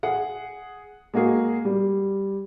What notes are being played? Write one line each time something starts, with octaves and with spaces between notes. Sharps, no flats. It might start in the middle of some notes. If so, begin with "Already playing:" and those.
G#4 F#5
G#3 A#3 F#4 G#4
G3